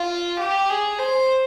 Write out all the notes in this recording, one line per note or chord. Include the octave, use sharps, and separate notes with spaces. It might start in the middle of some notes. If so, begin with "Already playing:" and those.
Already playing: F4
G4
G#4
C5